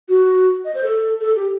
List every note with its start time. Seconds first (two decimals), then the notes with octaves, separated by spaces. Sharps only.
0.09 F#4
0.65 D#5
0.75 C5
0.83 A4
1.21 A4
1.36 G4